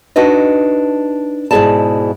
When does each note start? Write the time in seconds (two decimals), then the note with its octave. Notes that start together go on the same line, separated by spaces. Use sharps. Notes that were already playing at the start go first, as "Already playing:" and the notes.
0.16 D4 D#4 F#4 B4 D#5
1.51 G#2 B2 E4 G#4 D5 A5